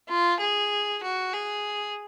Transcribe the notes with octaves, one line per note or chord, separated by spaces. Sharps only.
F4
G#4
F#4
G#4